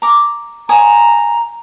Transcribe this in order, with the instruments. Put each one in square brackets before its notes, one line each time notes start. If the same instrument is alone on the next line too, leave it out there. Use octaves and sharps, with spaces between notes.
[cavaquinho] A#5 D6
[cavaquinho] C#5 G#5 D#6 [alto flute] A#5